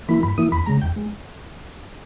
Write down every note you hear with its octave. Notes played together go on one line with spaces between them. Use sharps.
E3 A#3 E4 B5
G2 B5
E3 A#3 E4 D#6
E2 B5
C#3 G#3 A#5
E2 G5
G#3